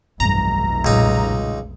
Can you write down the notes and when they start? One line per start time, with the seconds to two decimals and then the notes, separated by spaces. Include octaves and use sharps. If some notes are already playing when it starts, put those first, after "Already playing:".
0.20 F1 B1 G2 E3 A#5
0.85 C#2 A#2 G3 D#4